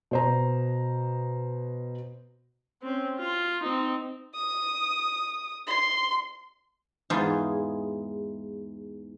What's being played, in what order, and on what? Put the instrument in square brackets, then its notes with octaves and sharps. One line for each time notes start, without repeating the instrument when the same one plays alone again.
[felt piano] B2 C5 A#5
[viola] C4 C#4
F4
C4 D#4
[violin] D#6
C6
[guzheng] E2 G#2 F4 G#4